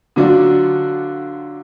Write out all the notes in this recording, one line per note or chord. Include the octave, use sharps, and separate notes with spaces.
D3 F#3 D4 F4 F#4